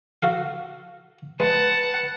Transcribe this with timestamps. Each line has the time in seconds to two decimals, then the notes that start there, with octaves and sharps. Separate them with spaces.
0.23 F#4 A4 F5
1.40 G#3 B4 F#5 A5